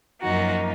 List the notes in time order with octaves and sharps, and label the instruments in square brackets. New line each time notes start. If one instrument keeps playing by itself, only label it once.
[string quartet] F#2 F3 A#3 D#4 F#4